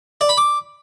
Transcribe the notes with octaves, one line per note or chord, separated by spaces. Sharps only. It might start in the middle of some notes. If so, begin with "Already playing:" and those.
D5
B5
D6